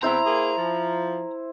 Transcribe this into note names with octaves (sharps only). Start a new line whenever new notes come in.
E2 C4 E4 C5 A#5
A#3 G#4
F3